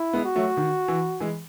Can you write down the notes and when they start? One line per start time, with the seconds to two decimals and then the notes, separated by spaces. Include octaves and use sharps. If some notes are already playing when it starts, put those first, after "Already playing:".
Already playing: E4
0.13 G#3 B3
0.24 F#4
0.36 F#3 A3
0.57 D#3
0.88 E3
1.20 E3 G#3